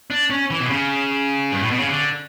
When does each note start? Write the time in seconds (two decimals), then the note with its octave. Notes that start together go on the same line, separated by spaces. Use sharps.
0.10 D4
0.30 C#4
0.51 E3
0.60 B2
0.70 C#3
1.52 G2
1.61 A2
1.71 B2
1.80 C#3
1.87 D3